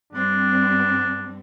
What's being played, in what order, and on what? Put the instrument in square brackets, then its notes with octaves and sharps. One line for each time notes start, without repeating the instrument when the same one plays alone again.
[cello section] G2 G3 C4 [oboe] D4